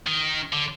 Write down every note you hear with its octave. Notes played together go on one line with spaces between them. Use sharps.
D#3
D3